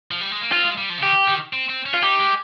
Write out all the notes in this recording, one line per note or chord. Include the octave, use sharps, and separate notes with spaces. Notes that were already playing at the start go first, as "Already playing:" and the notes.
F3
G3
G#3
A#3
C4 F4
G#3
G3
F3
C#3
D#3 G4
D#3
C4
C4
C#4
F4
D#4 G4
G#3